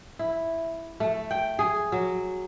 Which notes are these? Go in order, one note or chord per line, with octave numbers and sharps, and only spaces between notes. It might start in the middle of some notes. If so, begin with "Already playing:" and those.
E4
A3
G5
G#4
F#3